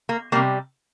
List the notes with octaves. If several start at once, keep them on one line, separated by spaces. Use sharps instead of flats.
A#3
C3 G3 A#3